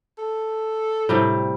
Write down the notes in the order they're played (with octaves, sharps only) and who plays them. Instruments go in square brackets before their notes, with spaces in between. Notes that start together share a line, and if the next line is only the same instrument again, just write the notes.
[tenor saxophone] A4
[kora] A2 C3 G3